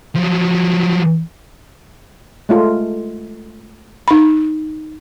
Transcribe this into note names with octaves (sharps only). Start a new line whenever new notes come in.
F3 F#3
G#3 A3 F4
D#4 B5